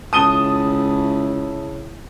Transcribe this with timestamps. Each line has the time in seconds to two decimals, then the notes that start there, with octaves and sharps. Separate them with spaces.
0.13 C#2 C#3 E4 A5 D#6 D#7 G7